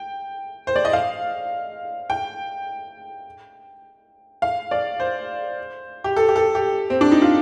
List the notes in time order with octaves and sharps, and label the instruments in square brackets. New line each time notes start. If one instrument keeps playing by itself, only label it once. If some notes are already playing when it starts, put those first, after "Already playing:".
Already playing: [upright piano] G5
C5
D5
D#5
F5
G5
F5
D5
C5
G4
A4
G4
A4
G4
C4
D4
D#4
F4